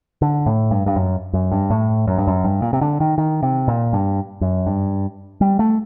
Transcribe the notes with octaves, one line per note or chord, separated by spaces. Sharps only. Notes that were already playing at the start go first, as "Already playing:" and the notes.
D3
A2
G2
G2
F#2
F#2
G2
A2
F#2
G2
F#2
G2
A#2
C3
D3
D#3
D#3
C3
A#2
G2
F#2
G2
G3
A3